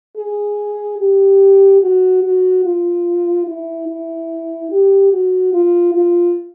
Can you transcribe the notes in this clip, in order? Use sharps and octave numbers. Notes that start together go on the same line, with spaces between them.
G#4
G4
F#4
F#4
F4
E4
E4
G4
F#4
F4
F4